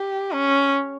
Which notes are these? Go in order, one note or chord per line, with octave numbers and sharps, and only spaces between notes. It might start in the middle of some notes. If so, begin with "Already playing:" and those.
Already playing: G4
C#4